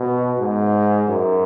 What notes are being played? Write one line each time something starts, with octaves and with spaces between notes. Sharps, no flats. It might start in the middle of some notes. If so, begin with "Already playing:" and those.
Already playing: B2
G#2
F#2